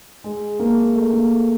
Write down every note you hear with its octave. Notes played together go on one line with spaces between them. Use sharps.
G#3
A#3
A3
A#3